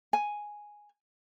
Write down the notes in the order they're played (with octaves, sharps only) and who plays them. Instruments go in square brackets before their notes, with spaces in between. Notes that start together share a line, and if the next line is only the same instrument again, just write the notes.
[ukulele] G#5